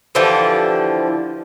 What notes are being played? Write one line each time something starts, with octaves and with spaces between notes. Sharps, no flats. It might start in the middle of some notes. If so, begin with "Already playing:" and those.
D3 E3 F3 G4